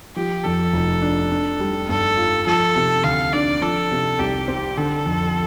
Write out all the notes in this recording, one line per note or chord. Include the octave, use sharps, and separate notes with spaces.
F3 G4
F2 A4
F1
D4
D4
G3
G2 A4
F4
F3 A4
C3
D2 F5
D4 D5
F3 A4
C3
C2 G4
C4
D3 A4
F2